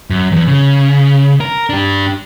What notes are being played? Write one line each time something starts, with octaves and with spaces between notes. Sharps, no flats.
F#2
E2
C#3
A#4
D4 G4